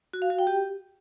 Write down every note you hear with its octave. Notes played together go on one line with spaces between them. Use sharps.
F#4
F5
F#4
G5
G4